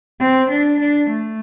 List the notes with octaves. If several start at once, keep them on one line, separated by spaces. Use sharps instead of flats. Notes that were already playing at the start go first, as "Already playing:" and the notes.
C4
D4
D4
A3